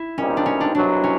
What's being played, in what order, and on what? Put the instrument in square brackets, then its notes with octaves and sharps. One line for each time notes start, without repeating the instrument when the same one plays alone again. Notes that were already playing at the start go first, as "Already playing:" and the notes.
Already playing: [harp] E4
[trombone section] B1 A#2 G3 C4 D#4 [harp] C#4
[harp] D4
C#4
D4
[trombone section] C2 B2 F#3 [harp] D4
[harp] C#4